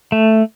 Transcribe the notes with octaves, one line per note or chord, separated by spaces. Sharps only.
A3